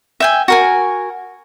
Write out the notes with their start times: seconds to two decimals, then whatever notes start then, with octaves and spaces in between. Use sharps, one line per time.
0.20 E5 G5 G#5
0.48 F#4 A#4 G#5